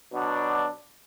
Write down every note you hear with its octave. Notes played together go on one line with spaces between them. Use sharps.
B2 F#3 D4